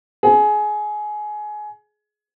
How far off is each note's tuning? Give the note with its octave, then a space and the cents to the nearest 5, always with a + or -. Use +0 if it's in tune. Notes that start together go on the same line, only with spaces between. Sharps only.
G#4 +20